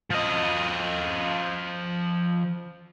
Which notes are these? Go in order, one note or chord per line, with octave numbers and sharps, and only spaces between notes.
F3 D#5